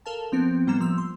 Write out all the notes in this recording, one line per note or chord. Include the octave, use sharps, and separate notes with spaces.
A4 A#4 F5 A5
F3 B3 C4
A2 G3 A#3 B3 A#5 E7
F3 E6
C6